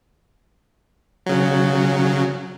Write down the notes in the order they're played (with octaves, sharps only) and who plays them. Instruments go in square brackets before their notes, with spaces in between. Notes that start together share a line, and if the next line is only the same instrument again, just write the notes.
[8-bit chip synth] C#3 F#3